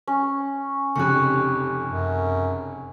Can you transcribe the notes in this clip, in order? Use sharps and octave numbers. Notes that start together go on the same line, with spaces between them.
C#4
F1 F2 C#3 G4 C#6 F#6
F#2